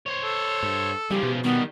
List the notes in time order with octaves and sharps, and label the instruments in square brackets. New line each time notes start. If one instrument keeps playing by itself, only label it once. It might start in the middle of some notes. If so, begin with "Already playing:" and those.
[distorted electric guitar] C5 C#5
[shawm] A4
[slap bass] G2
[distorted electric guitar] C#3 F3 [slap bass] G3 [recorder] G4
[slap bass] B2
[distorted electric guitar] D#3 G3 [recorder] B3